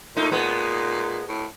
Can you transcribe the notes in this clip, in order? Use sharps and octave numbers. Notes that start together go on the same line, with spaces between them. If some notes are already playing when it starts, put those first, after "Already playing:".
A#2 A3 D#4
A#2 G#3 B3
A2